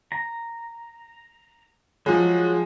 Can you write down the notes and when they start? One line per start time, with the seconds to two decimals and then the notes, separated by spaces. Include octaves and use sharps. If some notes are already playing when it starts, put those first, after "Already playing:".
0.12 A#5
2.06 F3 F#3 G#3